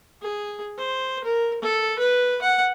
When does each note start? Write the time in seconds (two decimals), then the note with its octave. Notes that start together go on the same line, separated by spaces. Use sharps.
0.22 G#4
0.78 C5
1.24 A#4
1.62 A4
1.99 B4
2.42 F#5